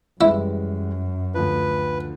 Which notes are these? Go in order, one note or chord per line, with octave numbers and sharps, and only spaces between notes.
F#2 E3 G3 G#3 E4
D2 F3 B4